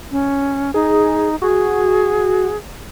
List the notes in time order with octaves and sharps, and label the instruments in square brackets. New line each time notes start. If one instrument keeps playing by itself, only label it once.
[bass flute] C#4
[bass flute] D#4 [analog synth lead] G#4
[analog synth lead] F#4 [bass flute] G#4